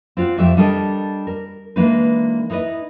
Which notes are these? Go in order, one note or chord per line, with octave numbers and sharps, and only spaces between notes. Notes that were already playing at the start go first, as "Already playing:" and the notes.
C4 F4 D5 F#5
F2 A3 G4 C5 E5 G5
G3 D4 A4 A#4 D#5
A#4
E3 G#3 A#3 D4 D#4 B4
D#4 E4 B4 D5 D#5